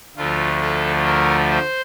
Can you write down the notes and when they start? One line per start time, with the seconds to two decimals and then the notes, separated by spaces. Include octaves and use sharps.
0.16 D2 D3 F3 A3 F4
0.61 A4
1.06 A#4
1.50 C5